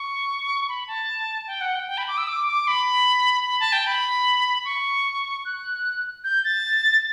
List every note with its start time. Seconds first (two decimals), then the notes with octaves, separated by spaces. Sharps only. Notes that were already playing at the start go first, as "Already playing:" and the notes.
Already playing: C#6
0.69 B5
0.88 A5
1.47 G5
1.61 F#5
1.75 G5
1.88 G5
1.98 B5
2.08 D6
2.18 E6
2.28 D6
2.48 D6
2.67 B5
3.47 B5
3.60 A5
3.73 G5
3.87 B5
4.65 C#6
5.45 F#6
6.24 G6
6.44 A6